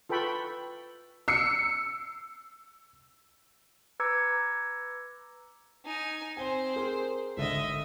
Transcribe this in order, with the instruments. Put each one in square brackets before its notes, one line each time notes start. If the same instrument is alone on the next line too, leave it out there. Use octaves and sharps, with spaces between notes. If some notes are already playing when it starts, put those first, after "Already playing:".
[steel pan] F4 A4 B4 G5 B5 C#6
[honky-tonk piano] E6 C7 C#7
[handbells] B4 A#5 D6 E6 G#6 C#7
[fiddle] D#4 G#5
[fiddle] C4 C5 [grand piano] G#5 G7
[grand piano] G#4 A#4
[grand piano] G#1 D3 [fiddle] D#5 E5